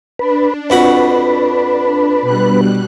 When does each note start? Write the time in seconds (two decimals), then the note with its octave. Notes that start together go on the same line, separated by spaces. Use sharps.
0.19 D4 B4
0.70 F2 F#4 B4 B5
2.22 B2 G3 F#6